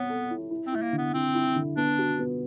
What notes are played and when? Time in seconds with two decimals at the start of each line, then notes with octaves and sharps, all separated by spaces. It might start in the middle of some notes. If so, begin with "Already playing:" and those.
Already playing: B3 C4 C#5
0.09 A4
0.30 E4
0.51 E4
0.67 C4
0.72 A3 E4
0.82 A#3
0.93 D3
0.98 B3
1.14 C4 E4
1.35 E4
1.56 D3
1.76 B3 D4
1.99 F#4
2.19 B3